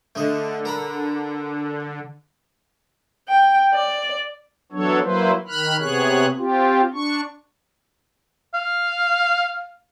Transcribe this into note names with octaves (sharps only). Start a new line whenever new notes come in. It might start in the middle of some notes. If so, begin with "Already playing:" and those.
D3 A3 D#5
A#4 A#5 B5
G5
D5
E3 F#3 B3 D4 A4 C#5
F#3 A#3 E4 B4 C5
D#3 B5 F6 F#6
C3 B3 G#4 C#5 F#6
C4 F4 G4
D4 C#6
F5